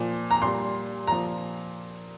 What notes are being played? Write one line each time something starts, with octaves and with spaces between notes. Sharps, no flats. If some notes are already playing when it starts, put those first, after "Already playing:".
Already playing: A#2 F3
A#5
A#2 G3 C6
A#2 F3 A#5